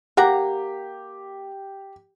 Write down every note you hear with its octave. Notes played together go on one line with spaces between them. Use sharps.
A#3 G4 F#5 A#5